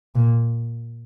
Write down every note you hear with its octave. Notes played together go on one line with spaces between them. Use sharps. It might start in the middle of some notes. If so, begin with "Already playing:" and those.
A#2